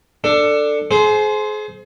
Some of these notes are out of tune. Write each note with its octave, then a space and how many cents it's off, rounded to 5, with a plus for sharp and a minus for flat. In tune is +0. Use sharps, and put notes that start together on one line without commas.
D4 +10 A4 +20
G#4 +35 C5 -5